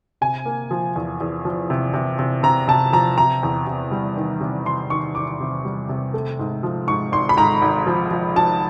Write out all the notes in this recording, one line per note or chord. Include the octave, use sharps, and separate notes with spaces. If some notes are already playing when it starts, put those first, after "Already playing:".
C3 G#5
A#3
F3
E2
E2
F3
C3
C3
C3
C3 A#5
C3 A5
F3 A#5
C3 A#5
E2
C3
G3
D#3
C3
C3 C6
D#3 C#6
D#3 D6
C3
G3
C3
A3
G#2
F3
G#2 C#6
G#1 C6
B5
G#2 A#5
G#1
F3
F3
F3 A5